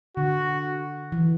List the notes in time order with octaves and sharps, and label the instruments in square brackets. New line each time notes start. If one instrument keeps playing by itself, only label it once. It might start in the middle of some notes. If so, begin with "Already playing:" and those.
[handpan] D3 [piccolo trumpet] F#4
[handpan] E3